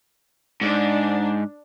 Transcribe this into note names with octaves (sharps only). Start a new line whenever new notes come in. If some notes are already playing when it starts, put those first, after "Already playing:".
G#2 D4